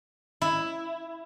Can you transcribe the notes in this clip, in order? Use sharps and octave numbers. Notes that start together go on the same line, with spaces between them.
E4